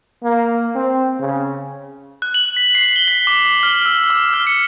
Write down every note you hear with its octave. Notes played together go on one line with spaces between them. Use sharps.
A#3
C4
C#3
F#6
F#7
B6
C7
G7
B6
D6
F6
E6
D6
F6
C#7